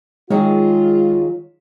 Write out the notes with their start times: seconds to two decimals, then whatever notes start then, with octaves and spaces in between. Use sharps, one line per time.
0.30 D#3 F#3 G#3 F4 G#4